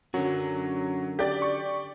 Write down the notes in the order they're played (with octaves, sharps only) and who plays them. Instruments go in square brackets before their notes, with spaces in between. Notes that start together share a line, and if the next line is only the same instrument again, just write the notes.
[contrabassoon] F#2 [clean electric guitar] D3 C#4 F#4 [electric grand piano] F#3
[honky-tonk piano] G4 D5
[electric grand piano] C#6